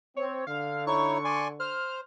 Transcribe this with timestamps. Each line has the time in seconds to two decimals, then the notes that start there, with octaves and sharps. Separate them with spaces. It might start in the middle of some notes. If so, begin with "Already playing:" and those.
0.16 C4 C#5
0.47 D3 F5
0.87 D#4 E4 C#5 C#6
1.25 D5 G#5 C6
1.60 C5 F6